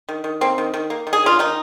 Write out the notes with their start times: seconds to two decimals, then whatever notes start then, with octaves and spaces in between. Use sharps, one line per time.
0.09 D#3
0.24 D#3
0.41 A#3 C4
0.58 D#3
0.74 D#3
0.90 A#3
1.07 D#3
1.13 G#4
1.24 A#3 F4
1.39 D#3 D#4